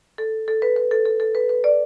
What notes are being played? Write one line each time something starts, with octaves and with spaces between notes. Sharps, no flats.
A4
A4
B4
B4
A4
A4
A4
B4
B4
D5